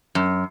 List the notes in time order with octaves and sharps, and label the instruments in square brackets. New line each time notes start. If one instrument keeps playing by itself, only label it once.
[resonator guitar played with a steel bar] F#2